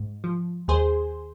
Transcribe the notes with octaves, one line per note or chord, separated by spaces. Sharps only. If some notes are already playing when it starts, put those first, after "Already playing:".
Already playing: G#2
F3
D#2 G#4 C5